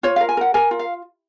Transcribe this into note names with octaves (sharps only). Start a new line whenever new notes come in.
F4 C#5
A#4 F5
G#5
A#4 F#5
A#4 G#5
F4
F5